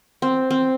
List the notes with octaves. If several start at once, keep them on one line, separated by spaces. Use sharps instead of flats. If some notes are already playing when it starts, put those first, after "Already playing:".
C4
C4